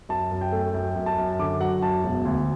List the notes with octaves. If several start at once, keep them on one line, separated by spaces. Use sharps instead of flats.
F#2 A5
F#2
G5
A3
F#2 G5
F#2
A5
F#2
D3 D6
F#3 F#5
F#2 A5
E1
D2